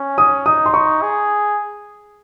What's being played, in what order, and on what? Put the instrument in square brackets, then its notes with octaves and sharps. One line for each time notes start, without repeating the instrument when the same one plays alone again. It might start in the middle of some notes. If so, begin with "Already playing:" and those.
Already playing: [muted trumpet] C#4
[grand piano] D#6
[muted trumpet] D#4 [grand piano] D#6
[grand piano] C6
C#6
[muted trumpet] G#4